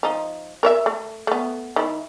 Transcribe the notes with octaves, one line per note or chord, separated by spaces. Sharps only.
F3 D#4
A#4 C#5 E5
A3
A3 B3
D#3 E4